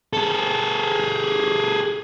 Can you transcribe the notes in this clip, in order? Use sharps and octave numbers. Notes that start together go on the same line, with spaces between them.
G#4 A4